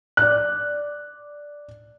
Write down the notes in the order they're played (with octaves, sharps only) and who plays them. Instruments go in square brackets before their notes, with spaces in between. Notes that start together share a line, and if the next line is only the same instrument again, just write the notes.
[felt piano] D5 F#6